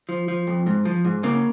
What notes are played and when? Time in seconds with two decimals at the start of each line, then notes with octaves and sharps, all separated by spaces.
0.09 F3
0.28 F3
0.47 F2
0.66 G#2
0.85 F3
1.05 G#2
1.23 C#3 A#3